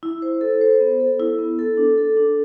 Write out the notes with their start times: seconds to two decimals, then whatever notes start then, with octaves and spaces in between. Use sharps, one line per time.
0.03 E4
0.22 C5
0.41 A4
0.61 C5
0.81 B3
1.00 A4
1.20 E4
1.38 B3
1.59 A4
1.77 D4
1.98 A4
2.17 D4